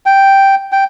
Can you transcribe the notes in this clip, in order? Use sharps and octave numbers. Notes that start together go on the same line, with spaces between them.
G5
G5